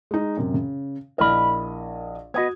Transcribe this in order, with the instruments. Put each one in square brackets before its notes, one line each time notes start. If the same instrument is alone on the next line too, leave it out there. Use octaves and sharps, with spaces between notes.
[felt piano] G#3 D#4
F#2 C3
C#3
[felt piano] A#1 E4 D#5 [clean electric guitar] A#4 B5
[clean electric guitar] B3 D#5 [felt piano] F#4 D#6 G#6